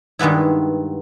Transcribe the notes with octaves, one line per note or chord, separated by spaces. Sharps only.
G2 D#3 G#3 B3 E4